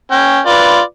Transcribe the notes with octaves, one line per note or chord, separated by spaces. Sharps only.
C#4 G5
F4 B4 D5